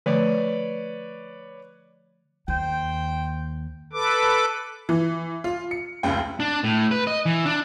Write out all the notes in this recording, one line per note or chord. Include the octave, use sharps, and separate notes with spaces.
D3 F3 A3 B4 C#5 D5
D#2 C5 G5
A4 B4 D6
E3
F4
C#7
F1 C#2 G5
D4
A2
B4
D#5
E3
D4